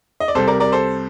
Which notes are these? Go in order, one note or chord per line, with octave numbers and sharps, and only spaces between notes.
D#5
D5
C2 C3 G3 A4 C5
A#4 D5
A#4 D5
A4 C5